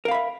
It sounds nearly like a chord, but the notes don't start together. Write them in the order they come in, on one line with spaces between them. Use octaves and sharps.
A#4 F5 B5 E5